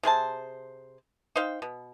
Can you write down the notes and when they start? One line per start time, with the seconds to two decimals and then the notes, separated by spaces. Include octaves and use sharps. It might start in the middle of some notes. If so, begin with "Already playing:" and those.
0.03 C3 G#4 C5 A5
1.36 D#4 C5 F5 G5
1.62 B2